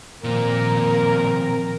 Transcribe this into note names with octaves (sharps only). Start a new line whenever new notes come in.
A#2 D#3 F3 C4 A#4